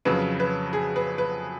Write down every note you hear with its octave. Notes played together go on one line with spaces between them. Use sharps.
F2 C#3 F#3 B4
B4
G#4
B4
B4